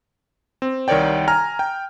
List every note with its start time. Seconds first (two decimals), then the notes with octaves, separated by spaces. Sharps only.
0.62 C4
0.88 C2 D#3 A#4 C#5 D5 G5
1.28 G#5 A#5 F6
1.59 G5